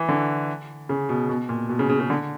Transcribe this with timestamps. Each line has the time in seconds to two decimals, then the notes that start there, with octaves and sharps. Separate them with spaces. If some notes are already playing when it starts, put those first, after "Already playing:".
Already playing: E3
0.09 D3
0.89 C#3
1.09 B2
1.29 B2
1.49 A#2
1.69 B2
1.79 C#3
1.89 C#3
2.00 C#3
2.10 D3